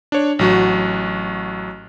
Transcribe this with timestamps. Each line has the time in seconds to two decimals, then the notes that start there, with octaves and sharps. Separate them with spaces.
0.12 D4 C#5
0.39 A1 F#3 F#4